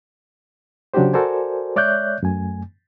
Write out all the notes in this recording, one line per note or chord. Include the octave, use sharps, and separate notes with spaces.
C#3 F#3 D4 F#4 G4 C5
F#4 A4 A#4 C5 D5 G#5
G#3 C#5 D5 E5 F#6 G6
F#2 A3 G#5